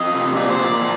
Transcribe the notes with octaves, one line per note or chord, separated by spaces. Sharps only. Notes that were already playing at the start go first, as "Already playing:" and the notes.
Already playing: F2 D#5
C3
A#2 D5
C5
A#2 D5
F3